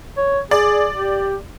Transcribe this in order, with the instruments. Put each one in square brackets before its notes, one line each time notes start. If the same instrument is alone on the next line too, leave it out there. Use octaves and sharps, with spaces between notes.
[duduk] C#5
[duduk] G#4 [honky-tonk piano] D5
[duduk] G4